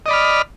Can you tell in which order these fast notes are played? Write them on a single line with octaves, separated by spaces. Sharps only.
D#5 D5 B5 F6